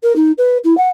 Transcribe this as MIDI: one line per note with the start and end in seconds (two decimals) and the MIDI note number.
0.03 0.15 70
0.15 0.31 63
0.38 0.57 71
0.64 0.76 64
0.77 0.89 78